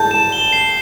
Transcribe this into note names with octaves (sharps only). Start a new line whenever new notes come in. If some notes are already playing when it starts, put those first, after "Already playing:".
Already playing: A5 G6
E7
G7
C7